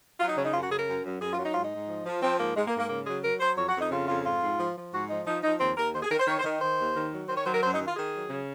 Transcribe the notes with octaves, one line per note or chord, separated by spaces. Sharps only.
F#3 F4
D#4
C#3 C#4
D#4
F#2 F4
F#4
C#3 G#4
A#4
F#2
F#2
F#2 G#4
F4
F#3
D#4
G#2 F4
D#4
G#2
F3
F3
F3 C4
G#2 A#3
G#2 G#3
A#3
G#2
A#3
C#3 A#3
F#3 G#4
F#3 A#4
F#3 C5
F2 C#5
F#4
F2
D#4
C#3 F4
F2 F4
G#2 F4
G#2
F3
F3
G#2 F#4
F3 D#4
F3 D#4
F3 D#4
D#2 C4
D#2 A#4
D#3 C5
G#4
D#3 A#4
C5
D#3 C#5
C5
D#3
D#3 C5
D#2
D#3
F#3
D#3 C5
C#5
F#3 C5
A#4
F#2 C5
D#4
D#3
F4
D#3 G#4
F#3
C#3